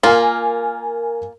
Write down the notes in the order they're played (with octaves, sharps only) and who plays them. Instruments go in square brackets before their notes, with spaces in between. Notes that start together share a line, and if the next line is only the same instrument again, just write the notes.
[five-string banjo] A#3 F4 [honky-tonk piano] A#4 G#5